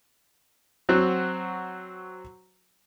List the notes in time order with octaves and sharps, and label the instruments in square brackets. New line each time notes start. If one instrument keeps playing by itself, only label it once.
[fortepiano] F#3 C4 F#4